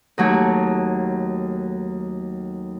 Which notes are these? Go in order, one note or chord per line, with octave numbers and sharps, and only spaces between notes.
D#2 F#3 A3